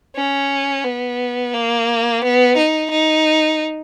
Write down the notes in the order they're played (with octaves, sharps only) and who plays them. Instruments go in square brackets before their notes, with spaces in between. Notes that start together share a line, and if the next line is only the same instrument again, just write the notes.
[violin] C#4
B3
A#3
B3
D#4
D#4